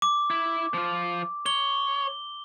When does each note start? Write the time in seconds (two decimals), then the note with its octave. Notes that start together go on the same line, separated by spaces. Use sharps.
0.02 D6
0.30 E4
0.74 F3 F4
1.46 C#5 G7